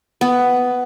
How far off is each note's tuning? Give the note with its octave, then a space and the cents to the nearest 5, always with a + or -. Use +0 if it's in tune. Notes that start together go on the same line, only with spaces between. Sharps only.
B3 +10